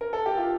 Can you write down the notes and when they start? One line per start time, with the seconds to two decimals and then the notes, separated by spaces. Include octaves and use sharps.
0.01 A#4
0.13 A4
0.26 G4
0.37 F4